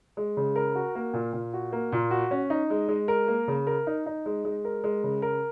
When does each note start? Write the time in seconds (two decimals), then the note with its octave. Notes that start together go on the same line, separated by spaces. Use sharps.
0.17 G#3
0.37 C#3
0.56 A#4
0.75 F#4
0.95 A#3
1.13 A#2
1.33 A#2
1.54 F#4
1.72 A#3
1.92 A#2
2.11 F#4
2.31 C#4
2.50 D#4
2.70 G#3
2.88 G#3
3.08 A#4
3.28 A#3
3.48 C#3
3.67 A#4
3.87 D#4
4.06 D#4
4.26 G#3
4.45 G#3
4.65 A#4
4.84 G#3
5.04 C#3
5.22 A#4